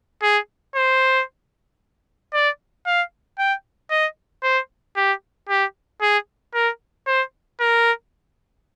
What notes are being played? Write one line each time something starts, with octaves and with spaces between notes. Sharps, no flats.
G#4
C5
D5
F5
G5
D#5
C5
G4
G4
G#4
A#4
C5
A#4